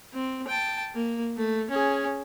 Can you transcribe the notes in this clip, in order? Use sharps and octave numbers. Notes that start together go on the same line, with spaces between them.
C4
G5 A5
A#3
A3
C#4 G#4